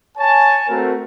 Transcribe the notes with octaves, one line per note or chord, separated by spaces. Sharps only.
C#5 G#5 A5
A3 C4 F#4 A#4